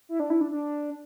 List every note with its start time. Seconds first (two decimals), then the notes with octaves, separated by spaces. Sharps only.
0.09 E4
0.20 D4
0.30 E4
0.41 D4
0.51 D4